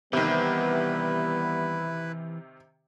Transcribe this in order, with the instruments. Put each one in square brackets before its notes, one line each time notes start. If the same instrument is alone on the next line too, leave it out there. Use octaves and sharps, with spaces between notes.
[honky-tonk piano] C3 D#3 [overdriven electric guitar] E3 [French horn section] G3 B3 [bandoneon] E4 B4